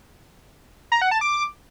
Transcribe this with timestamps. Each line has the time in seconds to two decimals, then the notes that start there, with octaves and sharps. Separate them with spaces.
0.92 A#5
1.02 F#5
1.11 A5
1.21 D6